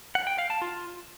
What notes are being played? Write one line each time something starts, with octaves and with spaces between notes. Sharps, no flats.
F#5
G5
F5
A5
F4